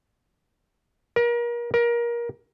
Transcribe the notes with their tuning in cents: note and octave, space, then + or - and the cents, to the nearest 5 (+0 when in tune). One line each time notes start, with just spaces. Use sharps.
A#4 +35
A#4 +25